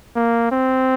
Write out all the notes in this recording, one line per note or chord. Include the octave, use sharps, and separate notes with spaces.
A#3
C4